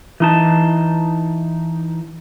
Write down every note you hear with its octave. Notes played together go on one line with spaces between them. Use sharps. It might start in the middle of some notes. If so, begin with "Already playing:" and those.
E3 D#4 A5